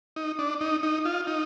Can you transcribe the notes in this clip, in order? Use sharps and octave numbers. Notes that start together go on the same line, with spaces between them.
D#4
D4
D#4
D#4
F4
D#4